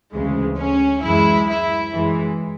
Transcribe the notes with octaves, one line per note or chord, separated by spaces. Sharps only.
D2 C#3 E3 G#3
C#4
F#2 E3 G#3 E4
E4
F#2 E3 G#3